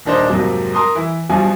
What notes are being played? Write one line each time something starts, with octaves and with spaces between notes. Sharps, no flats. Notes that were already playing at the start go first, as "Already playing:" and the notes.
D#1 D#3 D4 D#4 C5 D#5
F2 G#2 C3 F#3 A#3
A#4 C6 D#6
E3 E4
G2 B2 F3 F#3 G#5